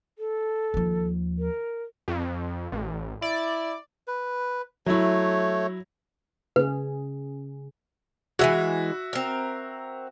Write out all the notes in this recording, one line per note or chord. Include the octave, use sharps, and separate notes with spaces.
A4
D#2 F3
A#4
F2
A1
E4 D5
B4
F#3 A3 E4 C#5
C#3 G#4 B4
E3 F3 G#3 F#4 E5
C4 A#4